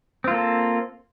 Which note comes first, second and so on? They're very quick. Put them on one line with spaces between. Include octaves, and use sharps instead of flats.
C4 F4 A#3 A4